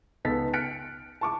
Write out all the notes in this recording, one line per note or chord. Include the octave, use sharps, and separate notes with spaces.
C#2 B3 D#4 A4 A6 B6
F6 F#6 B6 C#7 D7
A5 C#6 D6